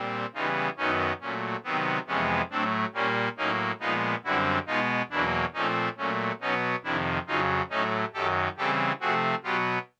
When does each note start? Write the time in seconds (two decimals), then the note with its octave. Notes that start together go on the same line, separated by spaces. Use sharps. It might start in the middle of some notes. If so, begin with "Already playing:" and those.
Already playing: A#2 G3 C4
0.34 C#3 E3 G3 B3 D#4 F4
0.77 F#2 D#3 F#3 B3 C#4 D#4
1.21 A#2 F#3 A3 C#4
1.64 C3 D#3 F#3 B3 C4
2.07 F2 C3 E3 G#3 B3 C#4
2.50 A2 F#3 A3 C4 D4
2.94 A#2 G3 A#3 C#4
3.37 A2 F#3 A#3 C#4 D#4
3.80 A#2 F3 G#3 B3 D#4 F4
4.24 F#2 D3 G3 C4 E4 F#4
4.67 B2 G#3 B3 D#4 F4
5.10 E2 B2 F#3 A#3 D4 E4
5.54 A#2 F3 A3 C4 C#4 D#4
5.97 A#2 F#3 A3 C#4
6.41 B2 F#3 B3 C#4 D#4
6.84 F2 C3 D#3 D4 E4
7.27 F2 C#3 F#3 D#4 F4
7.70 A2 F#3 A3 C#4 D#4
8.14 F#2 D#3 F#3 G4 A4
8.57 C#3 E3 G3 C4 G4 A4
9.00 C3 F3 A3 C4 F#4 G#4
9.43 B2 F#3 B3 F4 G4